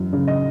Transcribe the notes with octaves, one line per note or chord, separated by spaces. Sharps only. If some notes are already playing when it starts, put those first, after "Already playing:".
Already playing: F#2 E3
C#3
D#5